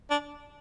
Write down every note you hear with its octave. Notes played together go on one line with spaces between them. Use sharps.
D4